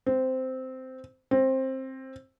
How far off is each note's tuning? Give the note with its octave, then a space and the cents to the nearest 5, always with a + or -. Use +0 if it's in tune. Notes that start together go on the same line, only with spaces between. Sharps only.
C4 -10
C4 +15